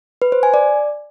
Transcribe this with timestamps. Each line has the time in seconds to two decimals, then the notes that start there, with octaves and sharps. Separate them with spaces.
0.22 B4
0.32 C5
0.43 G#5
0.54 D5